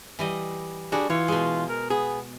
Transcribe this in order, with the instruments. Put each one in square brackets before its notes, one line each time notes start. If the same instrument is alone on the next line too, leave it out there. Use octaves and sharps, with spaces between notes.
[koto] E3 G3 D#5
[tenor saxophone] G3 [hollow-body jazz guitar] D4 G#4 [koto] F#4
[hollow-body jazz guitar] E3 [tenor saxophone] F4 [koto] C#5
[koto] B2 G#3
[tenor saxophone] A#4
[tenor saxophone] B3 [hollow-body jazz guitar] G#4